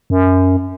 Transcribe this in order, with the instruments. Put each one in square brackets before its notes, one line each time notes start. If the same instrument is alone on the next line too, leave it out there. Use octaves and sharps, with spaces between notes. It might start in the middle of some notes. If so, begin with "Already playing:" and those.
[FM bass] F#2